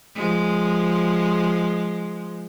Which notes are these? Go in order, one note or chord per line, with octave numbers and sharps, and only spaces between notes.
F3 G#3